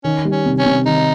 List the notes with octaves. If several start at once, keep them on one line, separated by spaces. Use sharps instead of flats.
D#3 C#4
G3
C#4
C3
C#4
C3
D#3 D#4